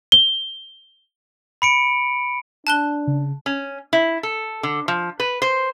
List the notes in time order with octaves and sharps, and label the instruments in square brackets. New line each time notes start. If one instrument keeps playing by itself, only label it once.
[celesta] G7
[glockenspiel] B5 C#7 D7
[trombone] D4 [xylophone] A5 F#6 G7
[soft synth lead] C#3
[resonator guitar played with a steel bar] C#4
E4
A4
D3
F3
B4
C5